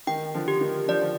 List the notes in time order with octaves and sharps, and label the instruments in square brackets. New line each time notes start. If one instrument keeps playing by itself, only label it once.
[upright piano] D#3 [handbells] G5
[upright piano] D3 F3
[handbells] G4
[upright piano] D#3
[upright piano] D3 F3 [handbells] D5
[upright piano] F3